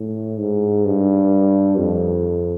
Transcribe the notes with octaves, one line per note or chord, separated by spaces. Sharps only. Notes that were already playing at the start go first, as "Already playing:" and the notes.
Already playing: A2
G#2
G2
F2